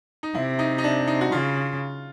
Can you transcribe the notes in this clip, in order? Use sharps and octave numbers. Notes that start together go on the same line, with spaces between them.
D#4
C3 E4
D#4
D#4
D4
D#4
F#4
C#3 F4